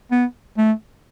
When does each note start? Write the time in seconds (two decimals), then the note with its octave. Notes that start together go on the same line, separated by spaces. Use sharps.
0.11 B3
0.58 A3